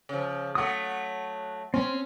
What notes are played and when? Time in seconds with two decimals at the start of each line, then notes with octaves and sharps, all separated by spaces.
0.09 C#3 F3
0.55 F#3 A3 F#5 D#6
1.74 C4 C#4